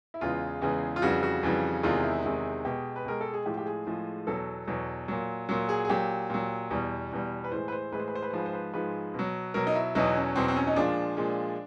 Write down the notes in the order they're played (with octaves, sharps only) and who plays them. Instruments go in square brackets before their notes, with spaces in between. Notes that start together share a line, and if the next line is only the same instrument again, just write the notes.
[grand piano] E4
E2 C#3 E3 G#3 F4
E2 C#3 E3 G#3
F4
F2 C#3 E3 G3 F#4
F#4
F2 C#3 E3 G3
E2 C3 D#3 G#3 F4
E4
E2 C3 D#3 G#3
B2 G#3 G4
B4
B2 G#3 A#4
A4
G#4
A2 F3 G#3 G4
G4
G#4
A2 F3 G#3
E2 B2 F#3 A4
E2 B2 F#3
A#2 F#3
A#2 F#3
G#4
G#4
A#2 F#3 G4
A#2 F#3
E2 B2 G3
E2 B2 G3
B4
A2 E3 G#3 C5
B4
C5
A2 E3 G#3 B4
C5
B4
C5
B4
C5
G#2 F3 G#3 B4
C5
B4
G#2 F3 G#3 B4
B2 F#3
B2 F#3 A#4
D#4
E4
E2 B2 F#3 D#4
C#4
E2 B2 F#3 C4
C4
C#4
D#4
A#2 F3 G#3 D4
A#2 F3 G#3